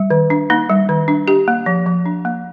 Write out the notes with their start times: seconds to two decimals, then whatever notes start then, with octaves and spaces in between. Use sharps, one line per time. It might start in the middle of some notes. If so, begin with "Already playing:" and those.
Already playing: G3
0.10 D#3
0.30 D4
0.50 A#3 D#4
0.70 G3
0.89 D#3
1.08 D4
1.28 D4 G4
1.48 A#3
1.66 F3
1.86 F3
2.06 D4
2.25 A#3